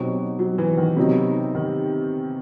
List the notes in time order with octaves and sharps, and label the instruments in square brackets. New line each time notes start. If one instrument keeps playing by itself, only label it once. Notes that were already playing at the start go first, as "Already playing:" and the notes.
Already playing: [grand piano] B2 F#3 C4 D#4 G4
[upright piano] F#3
E3
D#3
[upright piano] C3 [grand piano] D#3 F#3 B3 D#4
[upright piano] D#3